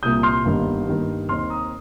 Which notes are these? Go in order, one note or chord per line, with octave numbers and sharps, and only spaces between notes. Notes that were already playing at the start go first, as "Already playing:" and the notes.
C2 A#2 A#3 D#6 G6
C6 F6
G1 G2 D#3 A#3 D#4
G2 D#3 A#3
D#2 D#3 C4 D#4 C6 F6
A#5 D#6